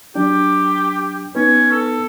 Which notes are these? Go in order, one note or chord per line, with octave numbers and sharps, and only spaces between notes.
F#3 D4 G4
B3 C#4 D#4 B4
A4